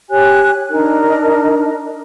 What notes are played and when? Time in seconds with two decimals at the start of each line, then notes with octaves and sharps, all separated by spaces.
0.10 G4 C#5 G#5 F#6
0.70 D4 D#4 A#4